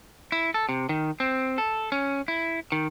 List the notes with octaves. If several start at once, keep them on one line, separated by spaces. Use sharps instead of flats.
E4
A4
C3
D#3
C4
A4
C#4
E4
D#3